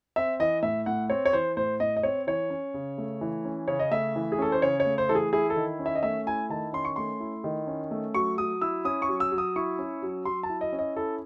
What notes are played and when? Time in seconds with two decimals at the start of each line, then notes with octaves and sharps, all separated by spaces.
0.16 C4 E5
0.40 E3 D#5
0.63 A2 E5
0.86 A2 F#5
1.10 C4 C#5
1.25 C#5
1.33 E3 C5
1.57 A2 C5
1.80 A2 D#5
1.97 D#5
2.03 C4 C#5
2.27 E3 C#5
2.50 C#4
2.74 C#3
2.98 A3
3.21 E3
3.45 C#4
3.68 C#3 C#5
3.79 D#5
3.91 A3 E5
4.16 E3
4.32 G#4
4.39 C#4 A4
4.52 C5
4.62 C#3 C#5
4.80 C#5
4.86 A3
4.98 C5
5.09 E3 A4
5.15 G#4
5.33 E4 G#4
5.50 A4
5.56 D#3
5.79 C#4
5.86 E5
5.95 D#5
6.03 A3 E5
6.26 E4 G#5
6.50 D#3 A5
6.73 C#4 C6
6.85 C#6
6.96 A3 C6
7.20 E4
7.44 D#3
7.67 C#4
7.91 A3
8.14 F#3 C#6
8.38 F#3 D#6
8.61 E4 E6
8.85 C#4 D#6
9.02 C#6
9.09 F#3
9.20 E6
9.32 F#3
9.38 D#6
9.56 E4 C#6
9.79 C#4
10.02 F#3
10.25 F#3 C6
10.43 A5
10.49 E4
10.61 D#5
10.73 C#4
10.79 D#5
10.96 E4 A4